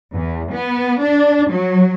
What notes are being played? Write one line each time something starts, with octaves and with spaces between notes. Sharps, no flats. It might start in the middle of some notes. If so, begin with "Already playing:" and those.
E2
B3
D4
F#3